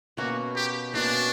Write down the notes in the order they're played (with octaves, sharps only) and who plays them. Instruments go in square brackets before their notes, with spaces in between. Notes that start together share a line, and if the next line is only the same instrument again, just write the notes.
[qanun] B2 A#3 C#4 [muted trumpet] F#4
[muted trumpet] G4
[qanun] B2 A#3 C#4 [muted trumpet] D4